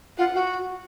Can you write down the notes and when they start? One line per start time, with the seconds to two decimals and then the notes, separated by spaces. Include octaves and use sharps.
0.18 F4 F#5
0.34 F#4